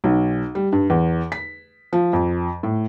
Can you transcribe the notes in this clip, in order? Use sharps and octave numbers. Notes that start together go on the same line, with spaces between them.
B1
G3
G2
E2
B6
F3
F2
A2